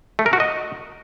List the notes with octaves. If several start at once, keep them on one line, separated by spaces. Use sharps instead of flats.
A3
A#4
F#4
D#5